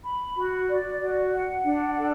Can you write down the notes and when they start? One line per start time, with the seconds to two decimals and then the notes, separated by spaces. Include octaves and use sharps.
0.05 B5
0.37 F#4
0.69 D5
1.01 F#4
1.32 F#5
1.64 D4
1.97 A4